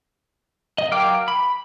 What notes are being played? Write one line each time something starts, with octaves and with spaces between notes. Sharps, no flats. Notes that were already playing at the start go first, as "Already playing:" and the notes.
D#5
F#3 A#4 F5 G5 D6
B5